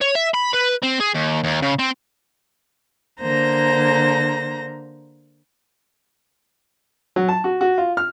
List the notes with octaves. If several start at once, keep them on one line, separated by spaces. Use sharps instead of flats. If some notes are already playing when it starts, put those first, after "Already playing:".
C#5
E5
B5
B4
C4
G#4
D#2
D#2
C#3
C4
D3 A#3 C5 A#5 A#6
F#3
A5
F#4
F#4
F4
F6